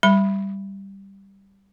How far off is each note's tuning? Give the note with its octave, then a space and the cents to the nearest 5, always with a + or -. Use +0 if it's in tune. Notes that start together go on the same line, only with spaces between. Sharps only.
G3 +0 B5 +0